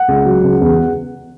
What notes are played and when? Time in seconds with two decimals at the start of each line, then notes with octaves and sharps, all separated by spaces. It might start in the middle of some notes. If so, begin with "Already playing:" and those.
Already playing: F#5
0.08 C#2
0.25 F#3
0.44 C#2
0.61 E2